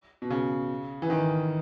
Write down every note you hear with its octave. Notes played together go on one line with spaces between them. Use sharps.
B2
C#3
E3
D#3